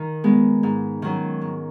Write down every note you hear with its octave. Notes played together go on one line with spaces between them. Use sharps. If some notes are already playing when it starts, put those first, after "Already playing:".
Already playing: D#3
G#3 B3
G#2
D#3 F#3 C#4
G#2